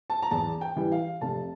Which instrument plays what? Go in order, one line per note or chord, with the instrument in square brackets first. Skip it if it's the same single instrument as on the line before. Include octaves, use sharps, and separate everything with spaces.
[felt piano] A5
A#5
E2 A5
G5
E3 G3
F5
F1 A5